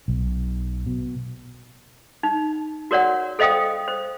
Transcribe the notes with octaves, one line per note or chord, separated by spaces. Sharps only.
B1
B2
D#4
F#4 A#4 C#5 D5 F#5
A4 C5 D#5 F5 G5 D#6
C5